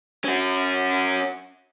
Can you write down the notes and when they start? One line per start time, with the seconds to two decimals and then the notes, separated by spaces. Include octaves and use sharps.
0.24 C#4 F#4